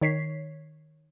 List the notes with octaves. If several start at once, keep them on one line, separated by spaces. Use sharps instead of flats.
D#3 C#5 B6 C7